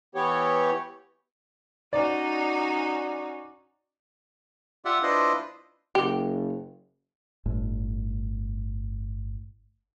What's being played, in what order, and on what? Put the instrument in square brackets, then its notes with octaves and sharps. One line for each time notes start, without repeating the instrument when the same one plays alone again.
[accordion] E3 B3 G4 C#5
[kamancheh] C#4 F#4 [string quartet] D#4 [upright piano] D5
[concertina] F4 G4 D5 E5 F#5
D4 E4 F4 B4 C5 D#5
[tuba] F#1 [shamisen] G4
[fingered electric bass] G1 A2